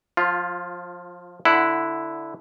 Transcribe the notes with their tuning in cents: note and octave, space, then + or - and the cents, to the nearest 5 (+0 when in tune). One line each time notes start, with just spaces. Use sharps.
F3 +25 F4 +0
D3 +0 E4 +0 F#5 +0